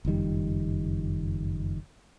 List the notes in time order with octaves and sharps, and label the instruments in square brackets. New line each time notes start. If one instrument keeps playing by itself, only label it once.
[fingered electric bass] F#1 F2 D#3 G3